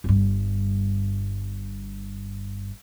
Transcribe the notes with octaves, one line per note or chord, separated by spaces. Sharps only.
G1 G2